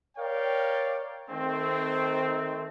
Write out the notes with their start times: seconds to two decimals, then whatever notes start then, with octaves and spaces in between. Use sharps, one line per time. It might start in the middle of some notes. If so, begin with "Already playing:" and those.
0.17 A#4 C#5 D5 F5 G5
1.30 D#3 A3 C4